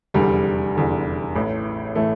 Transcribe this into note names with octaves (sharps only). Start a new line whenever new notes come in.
F1 E2 D3 G3
F1 E2 D3
A1 A2 E3
A2 E3 A3